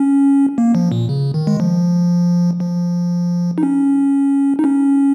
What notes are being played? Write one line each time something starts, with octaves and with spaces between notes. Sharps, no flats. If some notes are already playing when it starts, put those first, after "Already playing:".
Already playing: C#4
A#3
F3
A#2
C#3
D#3
G#3
F3
F3
D#4
C#4
D#4
C#4